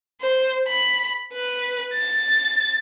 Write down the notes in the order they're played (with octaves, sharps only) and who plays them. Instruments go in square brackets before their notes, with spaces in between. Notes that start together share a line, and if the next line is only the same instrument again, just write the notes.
[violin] C5
B5
B4
A6